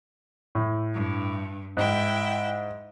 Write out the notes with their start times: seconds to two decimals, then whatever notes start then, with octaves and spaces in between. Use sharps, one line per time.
0.55 A2
0.93 G2
1.77 G#2 E4 G5